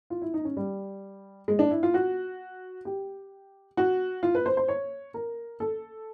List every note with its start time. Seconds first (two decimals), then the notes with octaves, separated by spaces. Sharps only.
0.10 F4
0.22 E4
0.34 D#4
0.45 C#4
0.57 G3
1.48 G#3
1.59 D4
1.71 E4
1.83 F4
1.94 F#4
2.85 G4
3.77 F#4
4.23 F4
4.35 B4
4.46 C5
4.57 C5
4.68 C#5
5.14 A#4
5.60 A4